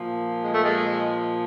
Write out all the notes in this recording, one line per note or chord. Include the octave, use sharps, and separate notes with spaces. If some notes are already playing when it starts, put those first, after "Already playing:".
Already playing: A#2 F3
G#3
A3
G#3